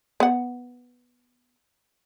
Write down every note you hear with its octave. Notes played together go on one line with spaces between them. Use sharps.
B3 F#5